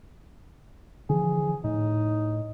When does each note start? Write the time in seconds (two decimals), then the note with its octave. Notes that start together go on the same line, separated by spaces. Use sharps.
1.09 D3 E3 F3 G#4
1.64 A2 D#4